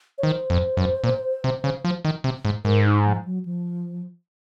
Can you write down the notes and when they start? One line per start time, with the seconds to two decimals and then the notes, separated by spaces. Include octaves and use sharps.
0.18 C#5
0.23 D#3 C5
0.50 F2
0.77 F#2
1.04 A#2
1.44 C3
1.64 C#3
1.85 F3
2.05 D#3
2.24 C3
2.45 G#2
2.65 G#2 A#4
2.85 D#4
3.05 F3
3.25 F#3
3.45 F3